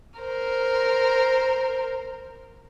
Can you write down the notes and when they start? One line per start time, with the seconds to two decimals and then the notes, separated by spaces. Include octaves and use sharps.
0.19 A#4 C5